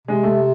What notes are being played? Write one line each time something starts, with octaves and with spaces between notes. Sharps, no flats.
C3 G#3
A3